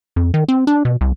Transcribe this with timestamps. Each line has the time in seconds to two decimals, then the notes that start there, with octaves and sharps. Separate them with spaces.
0.16 F2
0.34 D#3
0.48 C4
0.67 D4
0.85 B2
1.01 C2